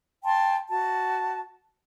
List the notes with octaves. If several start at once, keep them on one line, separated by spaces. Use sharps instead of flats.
G5 A5 C6
F#4 A5